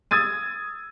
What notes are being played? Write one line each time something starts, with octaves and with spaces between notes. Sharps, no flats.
D#6 E6 G#6 A6 D#7